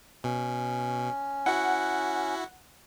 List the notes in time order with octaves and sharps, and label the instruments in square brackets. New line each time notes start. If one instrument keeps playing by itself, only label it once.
[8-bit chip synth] B2 [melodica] C#4
[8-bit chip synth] E4 F#4 [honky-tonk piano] F#5